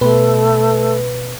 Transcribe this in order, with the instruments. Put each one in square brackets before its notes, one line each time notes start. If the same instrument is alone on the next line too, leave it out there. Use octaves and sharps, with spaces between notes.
[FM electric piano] B2 B4 [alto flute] A3